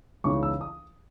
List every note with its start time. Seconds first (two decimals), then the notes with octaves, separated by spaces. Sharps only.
0.24 C#2 C#3 E3 B3 D#4 C#6
0.43 E6
0.61 D#6